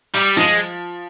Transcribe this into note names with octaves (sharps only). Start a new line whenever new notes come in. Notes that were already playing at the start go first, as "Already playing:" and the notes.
G3
F3 G#3